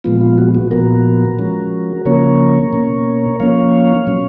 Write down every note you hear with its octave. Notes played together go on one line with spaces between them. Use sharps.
A#2 F3 G#3 B3 F4
F4
F#4
F#4
A#2 F3 B3 F#4 A#4
F3 G#3 C#4
C#3 F3 A#3 C#4 A#4 C#5
B2 A#3 C#4
F3 A#3 C#4 C#5 F5
B2 F#3 C#4